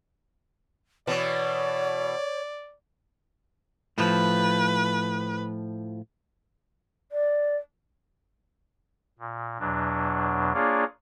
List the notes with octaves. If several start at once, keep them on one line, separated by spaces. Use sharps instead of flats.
B2 E3 C#5 D5
A2 F3 B4
D5
A#2
E2 B2 F#3 D4
A#3 D4 F4 G#4 C#5 D5